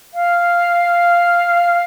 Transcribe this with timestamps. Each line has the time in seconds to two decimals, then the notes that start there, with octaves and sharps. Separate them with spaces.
0.14 F5